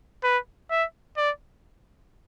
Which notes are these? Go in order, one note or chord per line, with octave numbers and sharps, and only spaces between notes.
B4
E5
D5